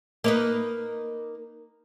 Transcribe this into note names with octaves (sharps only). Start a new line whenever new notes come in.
A#3 D#4 B4